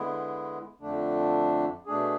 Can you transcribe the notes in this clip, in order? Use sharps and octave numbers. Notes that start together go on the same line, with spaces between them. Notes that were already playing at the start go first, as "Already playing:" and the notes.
Already playing: D3 G#3 B3 E4
F2 D3 A3 D4
B2 A3 D4 G#4